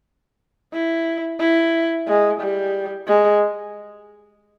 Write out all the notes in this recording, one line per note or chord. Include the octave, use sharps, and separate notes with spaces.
E4
E4
G#3
G3
G#3